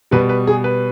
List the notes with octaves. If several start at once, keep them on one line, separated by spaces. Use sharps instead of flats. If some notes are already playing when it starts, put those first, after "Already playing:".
B2 G3 B4
B4
G#4
B4